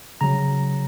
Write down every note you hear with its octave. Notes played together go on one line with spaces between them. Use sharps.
C#3 F#3 A#5